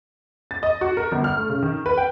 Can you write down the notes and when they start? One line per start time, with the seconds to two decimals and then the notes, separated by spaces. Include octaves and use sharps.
0.51 A6
0.63 D#5
0.81 F#4
0.97 A#4
1.12 G1
1.24 F6
1.37 A3
1.50 C#3
1.62 D#3
1.86 B4
1.97 G5